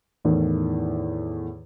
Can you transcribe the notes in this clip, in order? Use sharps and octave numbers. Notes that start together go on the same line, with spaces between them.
E2 A2 D#3